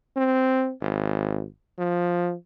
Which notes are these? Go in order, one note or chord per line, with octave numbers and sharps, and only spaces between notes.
C4
G#1
F3